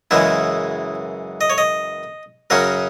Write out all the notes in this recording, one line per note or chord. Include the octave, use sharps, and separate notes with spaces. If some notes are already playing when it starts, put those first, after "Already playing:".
F#2 C#3 E3 G#3 E4
D#5
C#5
D#5
F#2 C#3 F#3 C#4 A#4